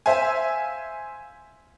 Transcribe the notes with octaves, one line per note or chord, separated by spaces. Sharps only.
C5 E5 F5 G#5